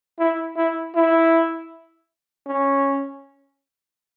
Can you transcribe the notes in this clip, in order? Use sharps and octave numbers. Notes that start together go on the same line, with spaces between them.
E4
E4
E4
C#4